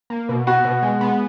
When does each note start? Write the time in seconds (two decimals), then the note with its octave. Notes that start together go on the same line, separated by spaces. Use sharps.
0.10 A#3
0.29 B2
0.47 B3 F#4
0.65 B2
0.83 G#3
1.01 B3